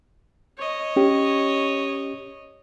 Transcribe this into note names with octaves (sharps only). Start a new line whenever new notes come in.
C#5 D#5
C#4 G4